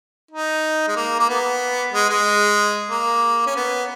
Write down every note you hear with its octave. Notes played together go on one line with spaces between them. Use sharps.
D#4
G#3
A#3
A#3
B3
G#3
G#3
A#3
C#4
B3